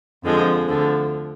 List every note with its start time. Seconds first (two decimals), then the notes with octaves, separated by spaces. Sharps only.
0.24 F2 D3 F3 G#3
0.68 D2 D3 F3